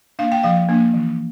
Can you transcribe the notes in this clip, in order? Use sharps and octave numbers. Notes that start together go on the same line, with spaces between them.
A#3 D4 F5
G5
F3 F5
A#3 D4
E3